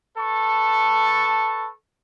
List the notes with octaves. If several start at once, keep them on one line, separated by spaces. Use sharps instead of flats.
A4 B4 A5 C#6